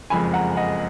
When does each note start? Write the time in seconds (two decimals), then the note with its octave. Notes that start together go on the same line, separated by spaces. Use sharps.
0.10 F#1 F2 F3 G#3 G#5 B5
0.33 F#5 A#5
0.57 D#5 F#5